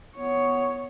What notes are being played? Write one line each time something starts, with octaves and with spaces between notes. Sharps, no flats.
B3 C#5